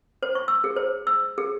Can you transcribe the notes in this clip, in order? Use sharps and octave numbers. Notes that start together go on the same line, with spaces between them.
C5
C#6
E6
G#4
C5
E6
G#4